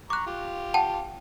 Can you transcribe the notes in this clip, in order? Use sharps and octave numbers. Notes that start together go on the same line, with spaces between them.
A#5 C#6 D6 F#6
F4 G4
F#5 G5 A5